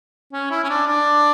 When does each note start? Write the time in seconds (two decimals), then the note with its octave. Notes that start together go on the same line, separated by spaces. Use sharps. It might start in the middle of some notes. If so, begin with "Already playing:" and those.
0.33 C#4
0.51 E4
0.64 C#4
0.70 D4
0.87 D4